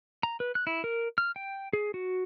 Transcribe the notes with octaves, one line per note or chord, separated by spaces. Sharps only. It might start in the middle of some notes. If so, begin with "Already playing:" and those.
A#5
B4
F#6
E4
A#4
F6
G5
G#4
F#4